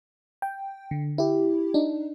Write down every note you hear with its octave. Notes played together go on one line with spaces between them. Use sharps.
G5
D3
E4 G4
D4 D#4